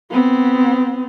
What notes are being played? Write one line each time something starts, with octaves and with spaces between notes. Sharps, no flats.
B3 C4